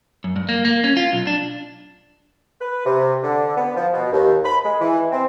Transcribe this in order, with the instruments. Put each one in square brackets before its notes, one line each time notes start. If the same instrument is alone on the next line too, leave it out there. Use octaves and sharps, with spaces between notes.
[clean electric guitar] F#2
G2
A#3
A#3
C#4
F4
B1
D4
[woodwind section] B4
C3
D3
B3
F3
B2
D#2
B5
G#3
E3
C4